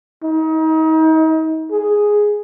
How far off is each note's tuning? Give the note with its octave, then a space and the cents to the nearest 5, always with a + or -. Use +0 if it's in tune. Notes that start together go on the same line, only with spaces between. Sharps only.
D#4 +35
G#4 +0